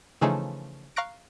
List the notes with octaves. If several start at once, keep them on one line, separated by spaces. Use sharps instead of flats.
C#3 E3 F3 A3 D#4 G#4
F5 A#5 C#6 F#6 A#6 D7